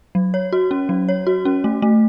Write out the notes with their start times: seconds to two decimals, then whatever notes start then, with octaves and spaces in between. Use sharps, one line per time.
0.15 F#3
0.34 C#5
0.52 F#4
0.71 C#4
0.89 F#3
1.09 C#5
1.27 F#4
1.45 C#4
1.64 A3
1.82 A3